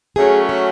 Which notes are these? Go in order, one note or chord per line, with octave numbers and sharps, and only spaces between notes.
F#3 A3 C#4 G#4
F#4